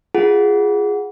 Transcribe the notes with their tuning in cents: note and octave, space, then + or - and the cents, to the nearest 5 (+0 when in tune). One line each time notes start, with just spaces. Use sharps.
F4 +0 G#4 +0 F#5 +0